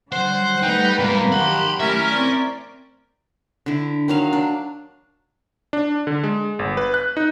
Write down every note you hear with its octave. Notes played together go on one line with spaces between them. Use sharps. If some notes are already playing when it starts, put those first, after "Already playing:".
D3 F#3 G3 C5 F#5
G3 A3 D#4 B4 G5
G#2 A#3 B3
D#3 F#3 G4 F#5 B5 C6
A3 C#4 E4 G4 A#4 E5
C4 D5
D3 E4
D#3 F#3 F5
D4
D4
D3
G#3
G1
B4
F#6
D#4